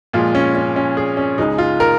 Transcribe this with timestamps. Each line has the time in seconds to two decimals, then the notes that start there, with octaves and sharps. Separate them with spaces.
0.13 A#2 F3 G#3 F4
0.35 C#4
0.55 C#4
0.76 C#4
0.97 G#4
1.17 C#4
1.38 C#2 C#3 G#3 D#4
1.58 F4
1.80 A#4